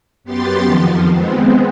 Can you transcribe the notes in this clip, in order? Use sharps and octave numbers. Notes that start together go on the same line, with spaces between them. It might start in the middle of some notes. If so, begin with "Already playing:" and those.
F#2 B3 G4 C6 A6
F2 D#3 F3
G#3 B3 C4